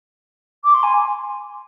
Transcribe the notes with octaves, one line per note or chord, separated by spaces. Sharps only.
D6
C6
G#5